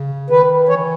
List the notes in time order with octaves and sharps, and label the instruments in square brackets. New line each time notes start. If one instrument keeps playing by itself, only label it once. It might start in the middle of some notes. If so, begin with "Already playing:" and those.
Already playing: [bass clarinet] C#3
[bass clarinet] D#3 [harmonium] B4
[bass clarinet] E3 [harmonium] C#5